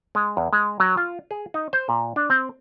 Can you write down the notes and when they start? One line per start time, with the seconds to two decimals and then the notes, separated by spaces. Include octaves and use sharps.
0.15 G#3
0.37 E2
0.53 G#3
0.80 F#3
0.97 F4
1.31 G#4
1.54 D#4
1.73 C5
1.89 A#2
2.16 D4
2.30 C4